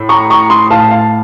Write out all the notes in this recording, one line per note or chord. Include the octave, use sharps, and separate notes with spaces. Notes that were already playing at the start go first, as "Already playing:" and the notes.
Already playing: A2
A#5 C#6
A#5 C#6
C6 D#6
A2 F5 A5
F5 A5